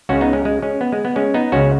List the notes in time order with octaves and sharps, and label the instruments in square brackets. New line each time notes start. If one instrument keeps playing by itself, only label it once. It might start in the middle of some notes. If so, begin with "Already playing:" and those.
[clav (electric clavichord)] C#2 C#3 C#4 F#4
B3 D#4
G#3 C#4
G#3
G#3 C#4
B3
G#3
B3
G#3 C#4
B3 D#4
C#2 C#3 C#4 F#4